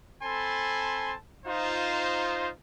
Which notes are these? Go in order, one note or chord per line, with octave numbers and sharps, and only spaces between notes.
C4 A4 G#5 A5 B5 C6
D#4 F4 C5